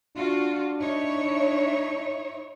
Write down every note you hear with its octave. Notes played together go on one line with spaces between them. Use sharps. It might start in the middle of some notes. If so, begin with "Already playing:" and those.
D4 F4 F#4
D#4 E4 C#5